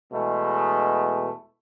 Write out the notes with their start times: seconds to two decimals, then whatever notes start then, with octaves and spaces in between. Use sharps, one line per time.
0.13 E2 B2 G#3 A3